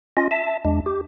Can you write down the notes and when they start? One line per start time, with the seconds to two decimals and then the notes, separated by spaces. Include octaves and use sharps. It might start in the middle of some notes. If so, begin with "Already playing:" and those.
0.17 C#4 F4 D#5
0.31 E5 A5
0.65 E2 G#3 D4
0.86 G4